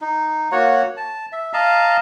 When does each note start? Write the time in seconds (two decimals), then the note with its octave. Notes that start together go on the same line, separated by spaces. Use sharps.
0.01 D#4
0.52 A#3 F#4 C#5 F#5
0.97 A5
1.32 E5
1.53 D#5 F5 A5 A#5